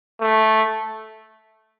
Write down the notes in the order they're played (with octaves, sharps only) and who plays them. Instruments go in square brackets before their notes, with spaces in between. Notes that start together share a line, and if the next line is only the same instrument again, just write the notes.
[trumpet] A3